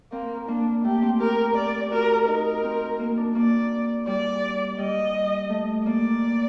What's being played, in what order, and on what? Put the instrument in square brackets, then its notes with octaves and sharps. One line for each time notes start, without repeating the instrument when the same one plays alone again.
[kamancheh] A#3 [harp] C4
[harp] A#3 [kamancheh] D4
[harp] A3 [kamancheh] G4
[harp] C4
[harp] G4 [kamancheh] A#4
[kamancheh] D5
[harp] F#4 [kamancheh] A#4
[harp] D#4 [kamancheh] A#4
[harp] C4
A#3
D4
[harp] A#3 [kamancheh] D5
[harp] G3 [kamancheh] D5
[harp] G3 [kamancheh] D#5
[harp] A3
[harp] A#3 [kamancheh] D5